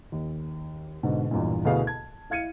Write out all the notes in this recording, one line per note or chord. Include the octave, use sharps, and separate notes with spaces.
D#2
G#2 B2 D3
B1 E2 G2 A#2
D2 B2 B3 E4 G#4 F5
A5 G#6
E4 F5 G#6 C#7 D#7